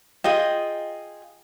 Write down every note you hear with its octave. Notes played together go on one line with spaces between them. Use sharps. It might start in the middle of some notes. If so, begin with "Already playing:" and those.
F4 G#4 D#5 G5